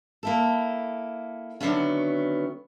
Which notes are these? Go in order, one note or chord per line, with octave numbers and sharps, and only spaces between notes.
A#3 E4 A4
D3 D#3 F#3 A3 B3 C#4